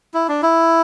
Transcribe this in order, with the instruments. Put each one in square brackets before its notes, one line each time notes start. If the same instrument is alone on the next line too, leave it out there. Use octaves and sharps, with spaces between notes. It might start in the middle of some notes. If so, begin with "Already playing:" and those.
[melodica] E4
D4
E4